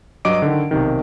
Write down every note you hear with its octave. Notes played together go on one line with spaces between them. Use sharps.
G2 F#3 D#5 D6 D7
D3 D#3
B1 C3 D#3